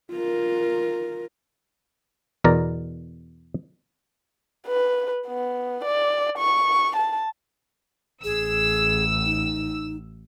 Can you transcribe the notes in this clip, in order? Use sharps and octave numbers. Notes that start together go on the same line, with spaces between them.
F4 A#4
E2 B2 A#4 D5 A#5
B4
B3
D5
C#6
A5
A1 G#4 E6
D#4